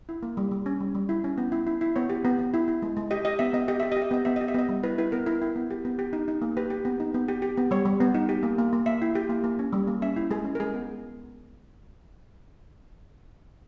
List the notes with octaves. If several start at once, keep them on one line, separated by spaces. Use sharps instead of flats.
E4
A#3
G3
G3
C#4
G3
G3
E4
C#4
B3
E4
E4
E4
B3 C#5
G4
B3
B3
E4
E4
G#3
G#3
G4 D#5
G4 D#5
B3 E5
B3 D#5
G4 D#5
G4 E5
G4 D#5
E5
B3 D#5
B3 E5
G4 D#5
E5
B3 D#5
G3
E4 B4
E4 B4
B3 A#4
E4 A#4
E4
B3
G4
B3
G4
D#4
D#4
A#3
G4 B4
G4
B3
D#4
B3
G4
G4
B3
G3 C#5
G3
B3
D#4
G4
A#3
A#3
A#3
A#3 E5
E4
G4
A#3
A#3
C#4
G3
A#3
C#4 E5
E4
G#3 G#4
C#4
A#4
G#3 G#4
B3